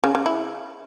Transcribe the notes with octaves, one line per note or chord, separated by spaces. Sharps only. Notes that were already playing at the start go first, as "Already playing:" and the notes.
C#3
C#3
E4